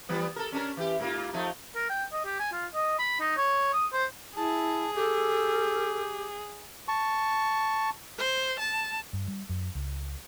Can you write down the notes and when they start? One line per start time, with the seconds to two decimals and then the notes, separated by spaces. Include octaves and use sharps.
0.09 E3 G3 B3
0.36 A4 A#4
0.52 C#4 D4 A#4
0.77 E3 G4
1.00 G#2 A#3 F4
1.33 F3 A3 D#4
1.75 A#4
1.89 G5
2.12 D#5
2.25 G4
2.39 G#5
2.52 F4
2.74 D#5
2.99 B5
3.20 D#4
3.37 C#5
3.73 D#6
3.93 C5
4.36 E4 G#4 A5
4.95 G4 A4
6.88 A5 C#6
8.18 C5
8.59 A5
9.13 G2
9.28 G3
9.49 F#2
9.75 C#2